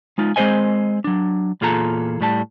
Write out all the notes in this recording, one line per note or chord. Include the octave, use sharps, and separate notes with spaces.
G#3 D#4 F4
G#3 C4 G#4 C5 D#5 G#5
F#3 D4
E2 A#2 F4 G#4 A4 A#5
A2 G3 A5